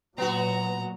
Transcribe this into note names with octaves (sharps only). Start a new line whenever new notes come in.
A#2 F#3 B3 F#4 A#5